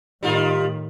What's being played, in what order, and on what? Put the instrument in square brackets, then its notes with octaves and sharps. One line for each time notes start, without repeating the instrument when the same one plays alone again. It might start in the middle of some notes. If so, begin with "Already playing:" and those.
[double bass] A2 D#3 [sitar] G3 D#4 F4